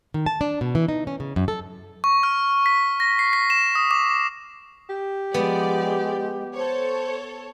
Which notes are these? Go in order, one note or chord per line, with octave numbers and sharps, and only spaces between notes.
D#3
A5
D4
B2
E3
D#4
C#4
C#3
F#2
A4
C#6
F6
B6
A#6
C7
B6
E7
D#6
D6
G4
F3 G#3 B3 D5
A4 C5 C#5